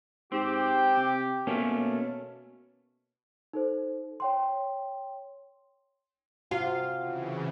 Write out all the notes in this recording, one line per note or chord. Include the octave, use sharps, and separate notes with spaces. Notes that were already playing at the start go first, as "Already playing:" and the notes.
G#2 C4 G4
C3
B2 A3 A#3 C#4
D#4 A4 C5
C#5 G5 C6
C3 F4 F#4 F5
C#3 E3